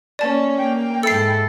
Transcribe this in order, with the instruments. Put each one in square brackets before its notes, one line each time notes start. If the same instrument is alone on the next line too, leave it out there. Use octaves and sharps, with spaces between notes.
[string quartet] A#3 C#4 [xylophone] D5 A5
[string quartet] A#3 [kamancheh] G5
[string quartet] G#2 E4 [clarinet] A4 [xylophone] E6 C7